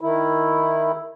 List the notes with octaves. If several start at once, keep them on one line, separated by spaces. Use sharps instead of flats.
D#3 E4